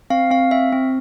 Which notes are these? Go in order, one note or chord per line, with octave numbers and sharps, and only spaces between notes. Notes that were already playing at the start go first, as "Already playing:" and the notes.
C4 F5
C4 F5
C4 E5
C4